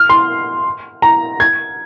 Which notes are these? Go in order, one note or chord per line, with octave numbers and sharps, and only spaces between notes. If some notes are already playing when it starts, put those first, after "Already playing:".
Already playing: F6
C6
A#5
G#6